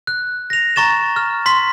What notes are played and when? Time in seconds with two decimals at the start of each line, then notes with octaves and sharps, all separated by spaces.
0.07 F#6
0.50 A#6 F7
0.76 A#5 C#6 A6 E7
1.16 F6
1.46 C6 B6